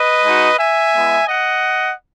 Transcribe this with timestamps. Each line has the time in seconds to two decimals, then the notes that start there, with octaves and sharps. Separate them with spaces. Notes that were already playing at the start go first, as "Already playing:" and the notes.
Already playing: B4 D#5
0.23 G#3 D#4 F#4
0.58 E5 G#5
0.94 G#3 B3 E4
1.28 D#5 F#5